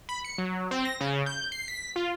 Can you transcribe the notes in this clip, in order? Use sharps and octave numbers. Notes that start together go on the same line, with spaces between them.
B5
C#7
F#3
C4
A#6
C#3
G6
C7
B6
F4